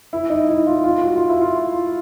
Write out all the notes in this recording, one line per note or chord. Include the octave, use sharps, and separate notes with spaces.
E4
D#4
E4
F4
F4
F#4
F4
E4
F4